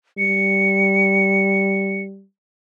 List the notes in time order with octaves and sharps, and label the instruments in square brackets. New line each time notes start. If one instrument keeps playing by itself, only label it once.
[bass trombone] G3 [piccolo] C#7